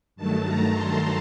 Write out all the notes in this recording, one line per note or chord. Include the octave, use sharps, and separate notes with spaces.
G2 D#3 F#3 A3 A5
A#5
C6